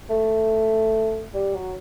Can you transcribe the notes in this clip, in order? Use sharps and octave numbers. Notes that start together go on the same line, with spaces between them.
A3
G3
F#3